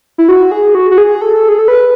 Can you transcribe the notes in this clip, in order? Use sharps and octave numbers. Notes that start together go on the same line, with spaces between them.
E4
F#4
G#4
F#4
F#4
G#4
A4
G#4
A4
B4